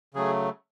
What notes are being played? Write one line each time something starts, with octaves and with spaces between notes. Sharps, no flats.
C#3 F#3 A3 G#4